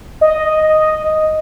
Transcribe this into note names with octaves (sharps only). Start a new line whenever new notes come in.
D#5